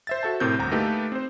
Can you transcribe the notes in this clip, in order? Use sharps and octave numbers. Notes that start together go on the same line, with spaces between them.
C5 E5 A6
F#4 A4 E5 A5
A2 C3 C4 A#4 G6
G1 D2 A#5
A3 A#3 D#4 G4 A4 B4
C4 C5